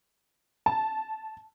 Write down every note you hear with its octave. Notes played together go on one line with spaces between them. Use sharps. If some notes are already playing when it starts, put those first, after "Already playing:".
A5